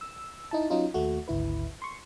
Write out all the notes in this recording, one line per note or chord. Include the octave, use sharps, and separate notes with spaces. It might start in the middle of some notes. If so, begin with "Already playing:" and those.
E6
D#4 E4 A5
F#3 C#4 D#4 F4
D#2 A3 F#4
G#1 D2 E4 B4
C6 C#6